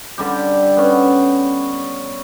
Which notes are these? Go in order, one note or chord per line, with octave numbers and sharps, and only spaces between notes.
D3 G3 G4
B3 C#4